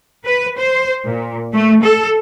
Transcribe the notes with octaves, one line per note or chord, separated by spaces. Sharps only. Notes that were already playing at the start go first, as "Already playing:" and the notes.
B4
C5
A#2
A3
A4